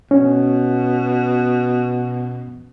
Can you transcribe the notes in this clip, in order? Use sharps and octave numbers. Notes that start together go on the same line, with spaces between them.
B2 C#4